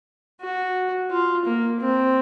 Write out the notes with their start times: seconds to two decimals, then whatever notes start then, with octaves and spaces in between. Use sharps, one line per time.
0.41 F#4
1.11 F4
1.46 A#3
1.80 C4